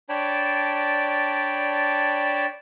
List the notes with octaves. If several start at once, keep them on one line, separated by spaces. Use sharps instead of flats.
D4 C#5 D5 G5 A5 B5